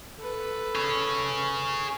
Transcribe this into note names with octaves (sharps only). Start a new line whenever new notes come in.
A4 B4
G#4 C#5